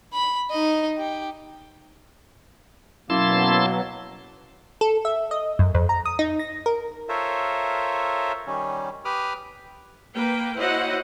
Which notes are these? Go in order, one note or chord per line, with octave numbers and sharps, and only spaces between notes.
B5
D#4 D#5
G4
F#2 B2 F#3 A#3 E4 A5 C6
A4
E5
D#5
F#2
F2
A#5
D#6
D#4
A#6
A#4
F4 A4 A#4 C5 C#5 E5
D#3 G3 C#4
G4 B4 B5 D6 D#6 F6
A#3 B4 G5
E4 F#4 C5 C#5 D#5 F#5